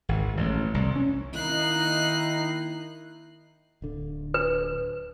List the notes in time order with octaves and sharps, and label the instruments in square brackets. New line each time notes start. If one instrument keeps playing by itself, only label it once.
[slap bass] G#1
A1
C2
C#4
[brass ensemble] D#3 E4 [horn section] A#3 D#4 [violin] F#6 C7
[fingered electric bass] D1 D3
[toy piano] B4